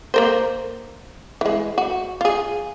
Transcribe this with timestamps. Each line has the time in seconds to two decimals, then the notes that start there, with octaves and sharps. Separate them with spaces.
0.14 A#3 A#4 C5
1.41 E3 G#3
1.78 F#4
2.21 F4 G#4